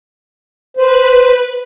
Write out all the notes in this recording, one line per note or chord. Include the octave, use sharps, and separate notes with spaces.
B4 C5